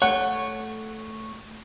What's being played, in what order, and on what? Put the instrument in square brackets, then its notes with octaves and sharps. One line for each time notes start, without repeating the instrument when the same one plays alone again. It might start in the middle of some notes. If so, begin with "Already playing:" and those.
[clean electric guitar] A3 C#5 [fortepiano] F#5